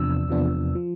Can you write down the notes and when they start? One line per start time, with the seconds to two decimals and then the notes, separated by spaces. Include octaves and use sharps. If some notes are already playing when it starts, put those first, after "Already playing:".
Already playing: E2 C3 F3 B3 D4 E6
0.28 E2 C3 F3 B3 D4
0.75 F3